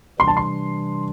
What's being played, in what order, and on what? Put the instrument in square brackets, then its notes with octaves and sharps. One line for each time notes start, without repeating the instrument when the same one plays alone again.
[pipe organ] C3 E3 G3 D4 [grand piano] C6
[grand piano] A5
C6